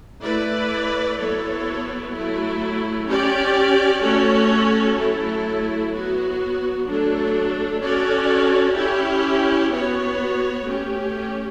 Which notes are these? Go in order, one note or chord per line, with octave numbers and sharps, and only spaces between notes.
A3 E4 B4 D5
F#3 B3 E4 A4 C#5
F#3 A3 E4
C#4 G4 D5
A3 C#4 F#4 A4 C#5
F#3 A3 E4 A4
F#3 B3 F#4
F#3 A3 D4 A4
C#4 F#4 A4 D5
C#4 E4 G4
B3 F#4 C#5
A3 C#4 G4